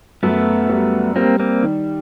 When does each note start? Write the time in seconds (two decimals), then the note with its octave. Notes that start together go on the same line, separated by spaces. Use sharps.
0.23 F#2 A3 B3
0.69 G3
1.16 G3 A#3 C4
1.40 A#3 C4
1.62 D#3